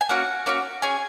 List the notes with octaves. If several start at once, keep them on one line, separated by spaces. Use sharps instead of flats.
G#5
A#3 C#4 F#4 F#5
A#3 C#4 F#4
C#4 G#4 G#5